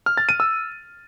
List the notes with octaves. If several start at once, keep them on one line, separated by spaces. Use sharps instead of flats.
F6
A6
D#7
E6